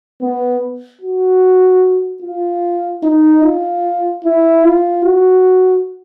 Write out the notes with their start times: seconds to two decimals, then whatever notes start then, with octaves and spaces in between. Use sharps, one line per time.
0.21 B3
1.01 F#4
2.22 F4
3.03 D#4
3.44 F4
4.24 E4
4.64 F4
5.04 F#4